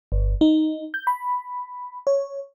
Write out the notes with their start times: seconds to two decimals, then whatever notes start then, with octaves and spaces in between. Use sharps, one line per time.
0.12 G1
0.41 D#4
0.94 G6
1.07 B5
2.07 C#5